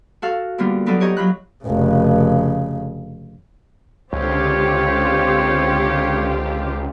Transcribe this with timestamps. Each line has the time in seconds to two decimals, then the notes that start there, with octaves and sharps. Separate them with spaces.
0.22 F#4 A4 F5
0.58 D3 G3 A#3 B3 F4
0.86 F#3 B3 D#4 F4 A4 D5
1.00 G4 C#5 D#5 A#5
1.17 F#3 F4 B5 F#6
1.64 F1 C#3
4.13 C#2 D3 C4 F4 G4 C#5